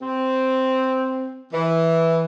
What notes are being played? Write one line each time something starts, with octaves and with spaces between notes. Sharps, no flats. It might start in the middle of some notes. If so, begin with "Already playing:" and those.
C4
E3